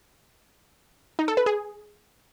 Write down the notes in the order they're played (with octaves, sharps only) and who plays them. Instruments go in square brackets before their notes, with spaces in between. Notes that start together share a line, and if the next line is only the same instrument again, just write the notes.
[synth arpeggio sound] D#4
A4
B4
G#4